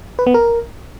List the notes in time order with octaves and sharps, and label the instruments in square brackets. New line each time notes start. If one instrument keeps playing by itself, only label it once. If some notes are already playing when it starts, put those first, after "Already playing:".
[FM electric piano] B4
B3
A#4